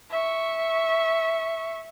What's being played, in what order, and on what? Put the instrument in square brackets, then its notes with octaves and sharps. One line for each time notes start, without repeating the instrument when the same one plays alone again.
[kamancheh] E5 C#6